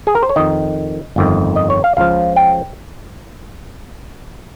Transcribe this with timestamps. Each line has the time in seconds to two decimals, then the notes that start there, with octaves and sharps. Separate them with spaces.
0.07 G#4
0.15 A#4
0.22 C5
0.29 C#5
0.36 F2 D#3 D#5
1.16 G1 F2 D#3
1.56 D#5
1.70 C#5
1.84 F5
1.97 C#2 C#3 F3 F5
2.36 G5